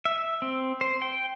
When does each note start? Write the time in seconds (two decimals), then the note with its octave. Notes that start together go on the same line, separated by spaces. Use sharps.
0.05 E5
0.42 C4
0.81 C5
1.02 G5